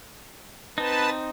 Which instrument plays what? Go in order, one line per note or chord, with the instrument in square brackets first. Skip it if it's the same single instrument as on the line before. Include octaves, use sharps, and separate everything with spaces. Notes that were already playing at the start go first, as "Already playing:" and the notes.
[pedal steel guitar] C4 D#4 [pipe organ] B4 A5